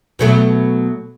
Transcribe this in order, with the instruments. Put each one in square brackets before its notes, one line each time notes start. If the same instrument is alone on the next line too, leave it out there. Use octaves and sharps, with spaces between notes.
[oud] B2 F#3 A3